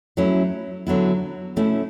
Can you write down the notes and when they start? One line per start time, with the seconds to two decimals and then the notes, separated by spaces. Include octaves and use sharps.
0.17 F#3 A3 C#4 E4
0.87 D3 F#3 B3 E4
1.56 B2 A3 C#4 E4